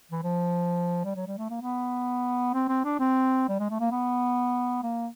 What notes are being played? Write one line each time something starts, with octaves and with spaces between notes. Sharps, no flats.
E3
F3
G3
F#3
G3
A3
A#3
B3
C4
C4
D4
C4
G3
G#3
A3
A#3
B3
A#3